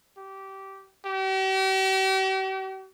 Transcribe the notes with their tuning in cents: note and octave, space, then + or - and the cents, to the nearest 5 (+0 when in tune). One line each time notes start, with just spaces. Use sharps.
G4 -15
G4 -45